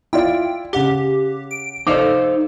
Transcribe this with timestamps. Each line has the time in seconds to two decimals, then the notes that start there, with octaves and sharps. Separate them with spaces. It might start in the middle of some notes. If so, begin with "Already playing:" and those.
0.13 E4 F4 D5 G5
0.73 C#3 G4 F#5 G7
1.51 D7
1.87 D#4 A4 C5 D5 D#5 F5 D6